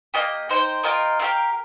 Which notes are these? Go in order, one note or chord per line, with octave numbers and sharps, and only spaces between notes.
A#3 G4 D#5
D#4 C5 G5
F4 A#4 D#5 G5
G4 A#4 F5